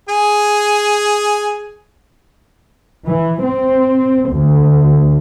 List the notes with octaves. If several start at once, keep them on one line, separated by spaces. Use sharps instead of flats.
G#4 G#5
E3
C4
D2